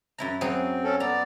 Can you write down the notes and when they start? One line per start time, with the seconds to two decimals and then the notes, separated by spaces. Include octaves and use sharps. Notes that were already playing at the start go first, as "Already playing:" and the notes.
0.18 F#2 E4 A#5
0.41 F#3 C4 G#4 C#5
0.84 C#4 A4
1.00 B3 D5 A#5